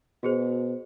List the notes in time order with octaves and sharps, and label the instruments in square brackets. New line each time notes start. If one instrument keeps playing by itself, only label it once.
[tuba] B2 [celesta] F#4 G#4 C5